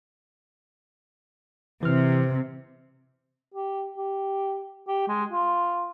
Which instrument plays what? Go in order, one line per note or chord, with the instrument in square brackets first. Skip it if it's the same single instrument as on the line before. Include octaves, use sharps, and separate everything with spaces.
[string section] C3 [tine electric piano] E3 F6
[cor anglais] G4
G4
G4
G#3
F4